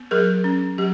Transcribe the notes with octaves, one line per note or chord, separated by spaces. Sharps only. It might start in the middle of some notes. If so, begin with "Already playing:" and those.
Already playing: B3
F#3 G#4 A#4
C#4
F#3 G4